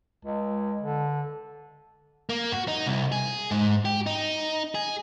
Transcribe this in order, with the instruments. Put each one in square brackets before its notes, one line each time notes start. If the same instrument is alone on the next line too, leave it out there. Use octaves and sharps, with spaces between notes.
[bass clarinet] C#2
D3
[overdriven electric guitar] A#3
F#4
D#4
C2
G#4
G#2
G4
D#4
G#4